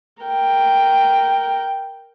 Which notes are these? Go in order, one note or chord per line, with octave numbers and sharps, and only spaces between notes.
A#4 G5